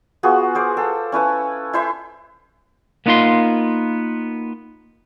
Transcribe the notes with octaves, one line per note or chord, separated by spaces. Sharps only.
B3 F4 F#4 G#4
G#4 C5 D6
A4 G5
C#4 E4 B4 A5
E4 C5 E5
A#3 B3 D#4 F4 F5 C6